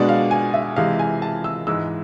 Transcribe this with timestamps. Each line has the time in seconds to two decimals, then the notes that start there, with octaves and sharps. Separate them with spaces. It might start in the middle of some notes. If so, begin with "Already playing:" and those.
Already playing: B2 G#3 B3 D4 D5
0.09 F5
0.31 G#5
0.54 E5
0.76 C3 E3 G#3 F5
0.99 G#5
1.22 A5
1.44 E6
1.67 G#2 E3 G#3 E6